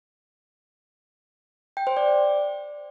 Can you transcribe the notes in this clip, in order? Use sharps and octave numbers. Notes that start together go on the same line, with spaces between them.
G5
C5
D5